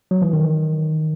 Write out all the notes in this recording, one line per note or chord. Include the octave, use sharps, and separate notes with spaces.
F#3
E3
D#3